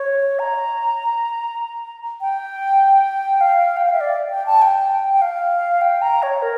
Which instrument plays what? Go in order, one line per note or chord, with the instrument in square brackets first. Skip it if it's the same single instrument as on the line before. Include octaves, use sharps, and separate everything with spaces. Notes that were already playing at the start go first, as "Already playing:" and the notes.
Already playing: [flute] C#5
A#5
G5
F5
G5
F5
E5
D5
G5
A5
G5
G5
F5
G5
A#5
C#5
A#4